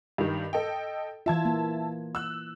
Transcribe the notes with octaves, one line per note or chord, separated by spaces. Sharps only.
G2 D#3
A4 D#5 G5
E3 F4 E5 A5 G#6
A#3
E6 F#6